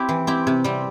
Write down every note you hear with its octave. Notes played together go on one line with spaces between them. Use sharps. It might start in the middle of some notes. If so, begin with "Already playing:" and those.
Already playing: C4 E4 G4
E3
C4 E4 G4
C3
G3 C4